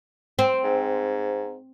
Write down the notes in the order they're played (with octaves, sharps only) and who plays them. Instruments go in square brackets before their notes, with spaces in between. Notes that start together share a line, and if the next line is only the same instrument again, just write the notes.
[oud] C4
[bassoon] G#2